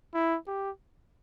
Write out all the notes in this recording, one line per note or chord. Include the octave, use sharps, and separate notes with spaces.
E4
G4